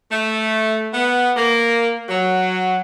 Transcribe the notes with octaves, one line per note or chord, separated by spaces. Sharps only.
A3
B3
A#3
F#3